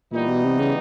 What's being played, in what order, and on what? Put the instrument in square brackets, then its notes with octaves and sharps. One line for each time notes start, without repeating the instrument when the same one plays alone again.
[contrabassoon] A#2 [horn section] E3 G3 B3 D#4
[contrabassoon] B2
C3
C#3